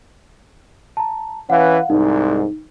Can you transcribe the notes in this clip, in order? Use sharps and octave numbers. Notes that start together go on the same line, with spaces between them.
A5 A#5
E3 C#4 B4 F5 F#5
C2 G#2 D#4